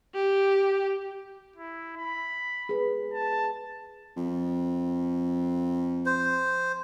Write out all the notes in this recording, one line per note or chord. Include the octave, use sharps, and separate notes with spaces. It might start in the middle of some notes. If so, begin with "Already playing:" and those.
G4
E4
B5
G#4 B4
A5
F2
C5